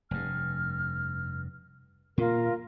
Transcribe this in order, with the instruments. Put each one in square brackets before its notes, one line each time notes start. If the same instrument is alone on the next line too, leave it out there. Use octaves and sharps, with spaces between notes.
[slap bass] F1 G2 [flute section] F6
[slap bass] A#2 A#3 [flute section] F4 A#4